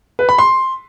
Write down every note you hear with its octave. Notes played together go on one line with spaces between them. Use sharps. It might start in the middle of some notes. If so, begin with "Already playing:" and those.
B4
B5
C6